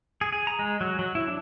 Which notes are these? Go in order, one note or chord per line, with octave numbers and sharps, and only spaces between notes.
G#4
G#4
A#5
G#3
F#3
F#3
E4
D4